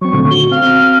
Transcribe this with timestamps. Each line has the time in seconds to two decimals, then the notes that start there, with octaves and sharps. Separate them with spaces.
0.02 F#3 C4 C#6
0.13 A#2 D3 A3
0.31 F#4 G7
0.51 C4 F5 F6